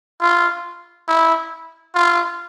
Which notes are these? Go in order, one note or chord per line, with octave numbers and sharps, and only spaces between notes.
F4
E4
F4